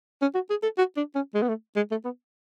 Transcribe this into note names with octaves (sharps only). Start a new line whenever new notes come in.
C#4
F#4
G#4
A4
F#4
D4
C#4
G#3
B3
A3
G#3
A3
B3